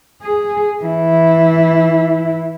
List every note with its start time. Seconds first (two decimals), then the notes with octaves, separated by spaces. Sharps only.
0.22 G#4
0.83 E3 E4